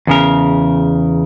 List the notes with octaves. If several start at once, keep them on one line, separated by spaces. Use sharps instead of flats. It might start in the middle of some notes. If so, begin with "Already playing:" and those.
E2 C#3 A#4